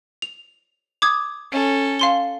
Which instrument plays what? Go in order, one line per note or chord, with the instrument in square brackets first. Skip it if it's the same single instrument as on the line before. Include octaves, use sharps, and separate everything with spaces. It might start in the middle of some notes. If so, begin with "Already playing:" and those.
[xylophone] F7
D6 D#6 G#6
[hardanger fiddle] C#4 A4
[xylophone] F5 C6 G7